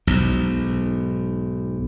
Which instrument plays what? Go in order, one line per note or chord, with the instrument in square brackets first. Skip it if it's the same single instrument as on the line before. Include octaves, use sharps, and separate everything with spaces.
[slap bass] B1 G#2